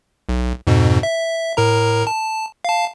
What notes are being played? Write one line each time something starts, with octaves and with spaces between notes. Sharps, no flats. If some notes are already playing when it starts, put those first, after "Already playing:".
B1
F2 G#2 B2
E5
A2 A#4 A#5
A5
F5 A5